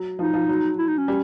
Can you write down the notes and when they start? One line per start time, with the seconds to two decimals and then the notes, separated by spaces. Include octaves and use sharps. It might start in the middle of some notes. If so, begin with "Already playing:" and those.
Already playing: F#3
0.19 F3 D#4
0.34 F3
0.49 F#3
0.78 E4
0.88 D#4
0.98 C#4
1.08 G3